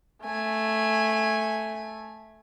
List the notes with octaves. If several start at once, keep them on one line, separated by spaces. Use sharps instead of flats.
A3 G#5